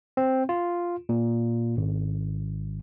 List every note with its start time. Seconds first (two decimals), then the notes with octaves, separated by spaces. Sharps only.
0.17 C4
0.49 F4
1.09 A#2
1.77 G#1